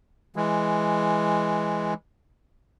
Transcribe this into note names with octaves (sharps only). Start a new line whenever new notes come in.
E3 G#3